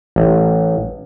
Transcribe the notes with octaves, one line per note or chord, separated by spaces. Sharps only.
A1